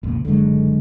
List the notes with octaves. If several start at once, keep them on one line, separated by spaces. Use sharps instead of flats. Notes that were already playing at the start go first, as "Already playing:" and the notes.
F1 C#2 A#2
F#1 D3 F#3 G#3